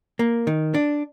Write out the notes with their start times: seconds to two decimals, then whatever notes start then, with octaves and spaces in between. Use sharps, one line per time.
0.19 A#3
0.47 D#3
0.75 D4